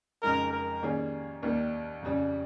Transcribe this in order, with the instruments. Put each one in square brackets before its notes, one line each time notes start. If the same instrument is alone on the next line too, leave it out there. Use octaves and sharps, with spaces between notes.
[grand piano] F2 C#3 G#3 D#4 [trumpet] A#4
[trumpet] A#4
[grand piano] D#3 G3 A#3 C#4 G#4
D#2 D#3 G3 A#3
F2 C#3 G3